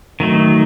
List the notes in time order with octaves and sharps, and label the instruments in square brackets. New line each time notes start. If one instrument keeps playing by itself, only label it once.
[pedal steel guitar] D#3 F#3 A3